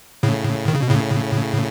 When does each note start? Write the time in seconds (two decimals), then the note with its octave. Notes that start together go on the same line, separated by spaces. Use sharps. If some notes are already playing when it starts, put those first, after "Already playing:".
0.23 A2 C#3
0.68 D#3
0.75 C#3
0.82 B2
0.90 A2 C#3